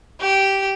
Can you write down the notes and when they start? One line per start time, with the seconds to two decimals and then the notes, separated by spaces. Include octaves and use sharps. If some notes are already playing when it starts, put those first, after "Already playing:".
0.21 G4